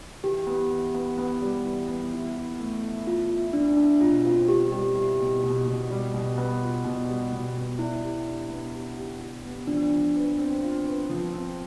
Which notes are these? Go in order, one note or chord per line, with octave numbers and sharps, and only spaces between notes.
E3 G4
B3
E3
B3
B3
G3
E3
B3
E4
E4
A3
E5
E4 F4
E5
D4 E4
D4 E5
B2 F4
C4 F4
G3 G4
G3 G4
E4 G4
B2
B2
B2
G3
B2
B3
F4
B2
G3
B2
B3
E4 D5
G4
D4
B3
G4
G4
G4
B3
F3 D4
F3
B4
C4
F4
B4
F3
C4